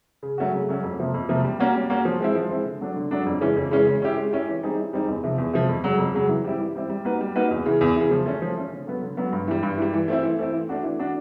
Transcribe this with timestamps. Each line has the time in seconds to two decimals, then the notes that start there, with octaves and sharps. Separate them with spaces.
0.23 C#3
0.38 F#3 A3 C#4 F#4
0.53 C#3
0.69 F#3 A3 C#4 F#4
0.83 F2
0.99 C3 F3 A#3
1.14 F2
1.29 C3 F3 A#3
1.44 G3
1.60 A#3 C#4 F#4
1.74 G3
1.90 A#3 C#4 F#4
2.05 F3
2.20 G#3 C4 E4
2.35 F3
2.50 G#3 C4 E4
2.66 D3
2.81 F#3 A3 D4
2.96 D3
3.11 F#3 A3 D4
3.26 F2
3.41 C#3 E3 G#3 C#4
3.57 F2
3.71 C#3 E3 G#3 C#4
3.87 G#3
4.02 C#4 E4 G4
4.18 G#3
4.32 C#4 E4 G4
4.48 E3
4.63 G3 C4 D#4 G#4
4.77 E3
4.93 G3 C4 D#4 G#4
5.08 E2
5.23 C3 F3
5.38 E2
5.53 C3 F3
5.69 F2
5.84 C#3 F#3
5.99 F2
6.14 C#3 F#3
6.29 E3
6.44 G3 C4 E4 G4
6.60 E3
6.75 G3 C4 E4 G4
6.89 G3
7.05 A#3 D#4 F#4 B4
7.20 G3
7.36 A#3 D#4 F#4 B4
7.51 E2
7.66 C#3 E3
7.81 E2
7.96 C#3 E3
8.11 F3
8.26 A3 C#4
8.42 F3
8.57 A3 C#4
8.72 D3
8.87 F#3 B3
9.02 D3
9.17 F#3 B3
9.32 G2
9.48 E3 G3
9.63 G2
9.78 E3 G3
9.93 E3
10.08 A3 C4 E4
10.23 E3
10.39 A3 C4 E4
10.53 E3
10.69 A3 D4 F#4
10.83 E3
10.99 A3 D4 F#4